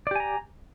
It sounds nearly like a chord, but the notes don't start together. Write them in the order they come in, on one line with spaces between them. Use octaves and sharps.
D5 G4 G#5 A#5